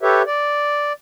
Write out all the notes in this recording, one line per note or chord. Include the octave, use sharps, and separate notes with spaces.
G4 A4 B4 C#5 E5
D5